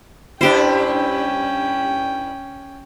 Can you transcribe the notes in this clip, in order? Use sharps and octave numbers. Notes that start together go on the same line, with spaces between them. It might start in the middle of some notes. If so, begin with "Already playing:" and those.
G2 C#4 D4 E4 G4 C5 G5